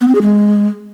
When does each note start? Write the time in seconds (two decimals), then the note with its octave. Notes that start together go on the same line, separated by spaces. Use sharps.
0.01 B3
0.08 C4
0.15 G#4
0.22 G#3